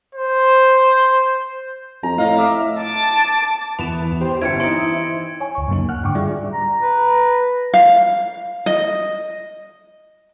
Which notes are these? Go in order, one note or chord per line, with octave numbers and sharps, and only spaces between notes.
C5
F2 A#5
A2 D#5 F5
E5 D6
A5 D6
E2 B3 E7 F7
G4 C5
G1 C#4 E4 G#6 C#7 D7
E3 C4 D#4 C6 D7
C#5 G#5 C#6
D2 C#6
F#2 C#3 A#3 D#4
F#5 F6 F#6
G#2 D3 G5 C#6 D6
G3 F4 G#4 D5 E5
A#5
B4
F5
D#5